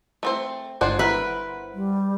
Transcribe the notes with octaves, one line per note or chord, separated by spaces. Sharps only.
A3 C4 C5
G1 G#3 D4 F4 C5 F#5
E4 A#4 B4
G3